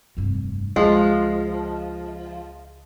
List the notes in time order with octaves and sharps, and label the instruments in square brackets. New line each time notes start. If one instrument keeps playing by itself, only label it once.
[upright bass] F1 G2
[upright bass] C#2 [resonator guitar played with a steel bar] F3 [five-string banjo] G#3